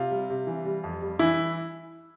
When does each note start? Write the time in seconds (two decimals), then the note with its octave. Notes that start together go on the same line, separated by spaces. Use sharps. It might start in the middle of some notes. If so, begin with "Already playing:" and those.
Already playing: C3 F4
0.11 G3
0.30 C3
0.47 E3
0.65 G3
0.84 F2
1.02 G3
1.19 E3 E4